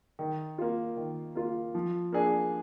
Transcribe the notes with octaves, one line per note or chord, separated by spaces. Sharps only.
D#3
A#3 F4
D#3
A#3 F4
F3
A#3 D4 G#4